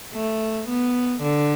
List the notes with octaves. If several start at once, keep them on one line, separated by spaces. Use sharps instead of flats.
A3
B3
D3